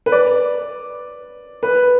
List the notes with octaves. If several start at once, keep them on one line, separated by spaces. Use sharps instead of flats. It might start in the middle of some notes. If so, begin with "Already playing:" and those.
B4
D5
B4